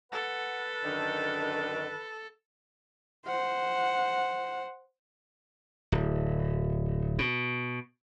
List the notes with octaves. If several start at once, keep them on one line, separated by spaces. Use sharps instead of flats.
A4 B4 F#5
F#2 D3 D#3 D4
C5 F#5
D1
B2